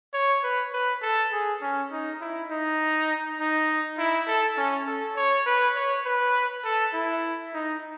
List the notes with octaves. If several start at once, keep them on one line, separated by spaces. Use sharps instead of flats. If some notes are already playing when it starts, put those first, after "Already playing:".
C#5
B4
B4
A4
G#4
C#4
D#4
E4
D#4
D#4
E4
A4
C#4
A4
C#5
B4
C#5
B4
A4
E4
D#4